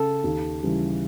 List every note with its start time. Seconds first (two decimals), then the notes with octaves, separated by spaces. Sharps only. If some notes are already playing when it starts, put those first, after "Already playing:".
Already playing: C#3 A4
0.24 D#2
0.63 C#3 E3 G3